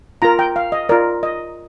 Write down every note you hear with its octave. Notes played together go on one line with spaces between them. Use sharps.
F4 A#4 A#5
G5
F5
D#5
F4 A#4 D5
D#5